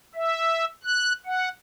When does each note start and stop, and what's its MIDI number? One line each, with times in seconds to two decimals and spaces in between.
0.15 0.65 76
0.84 1.13 90
1.26 1.49 78